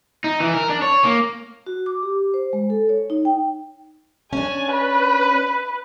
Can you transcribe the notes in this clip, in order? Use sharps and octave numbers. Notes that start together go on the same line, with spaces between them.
D#4
E3
A#4
D4
C#5
A#3
F#4
D6
G4
C5
G#3
A4
C#5
D#4
G5
C#4 D4 G#5
B4